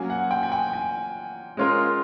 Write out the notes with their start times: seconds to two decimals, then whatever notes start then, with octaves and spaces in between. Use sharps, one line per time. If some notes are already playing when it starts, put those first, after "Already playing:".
Already playing: F#3 A#3 C#4 G#5
0.10 F#5
0.31 G5
0.43 G#5
0.52 G5
0.73 G#5
1.57 G#3 C#4 F4 A#4